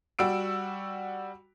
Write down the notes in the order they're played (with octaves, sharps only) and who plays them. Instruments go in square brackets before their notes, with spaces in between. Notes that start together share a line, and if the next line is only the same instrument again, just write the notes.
[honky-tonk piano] G3 F#4 E6 D7